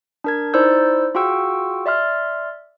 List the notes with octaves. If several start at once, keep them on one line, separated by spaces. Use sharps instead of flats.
D4 A#4 G#6
D#4 E4 C5 D5 E6 G6
F4 F#4 G#4 G5 C#6 E6
D5 E5 C6 F6